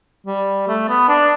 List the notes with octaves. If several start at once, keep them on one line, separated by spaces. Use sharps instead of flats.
G3
A3
B3
D4